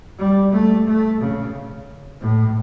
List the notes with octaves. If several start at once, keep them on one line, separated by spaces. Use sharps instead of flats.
G3
A3
A3
C#3
A2